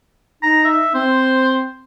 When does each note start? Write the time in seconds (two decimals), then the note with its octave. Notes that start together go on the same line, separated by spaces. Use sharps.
0.43 D#4 A#5
0.65 E5
0.94 C4 C5